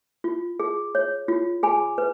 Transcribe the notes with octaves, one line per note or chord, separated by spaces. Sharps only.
F4
G#4
C#5
F4
G#4 G#5 B5
B4